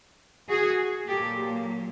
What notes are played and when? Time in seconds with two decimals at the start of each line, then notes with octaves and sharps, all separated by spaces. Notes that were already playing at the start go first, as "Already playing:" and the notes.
0.49 F#4 G#4
1.08 A#2 F#3 A#3 G4 A4